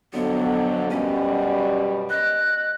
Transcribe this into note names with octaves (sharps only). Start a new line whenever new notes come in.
F2 D3 F#3 B3
F#2 B2 G3 C#4
D#5 F#6